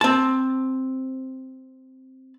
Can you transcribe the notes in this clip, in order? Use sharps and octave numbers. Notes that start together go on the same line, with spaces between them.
C4 A5